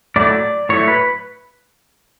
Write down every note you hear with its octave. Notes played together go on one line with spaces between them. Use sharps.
A2 F#3 A3 E4 D5
A2 F#3 A3 E4 C#5
B4